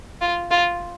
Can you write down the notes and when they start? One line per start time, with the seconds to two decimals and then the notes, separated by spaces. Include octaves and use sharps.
0.21 F4
0.51 F4